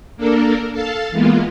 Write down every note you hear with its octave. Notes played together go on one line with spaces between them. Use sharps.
A#3 D4 A4 A#4
A4 F5 A5
E3 G#3 A#3 B3 F4